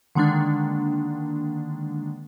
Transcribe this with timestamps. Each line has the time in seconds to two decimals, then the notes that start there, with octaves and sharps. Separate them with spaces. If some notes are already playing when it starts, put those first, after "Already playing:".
0.15 D3 D#3 G#3 A#3 D4